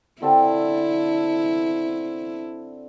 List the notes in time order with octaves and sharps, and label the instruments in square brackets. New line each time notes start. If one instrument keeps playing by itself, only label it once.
[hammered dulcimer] D3 C4 A4 [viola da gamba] E4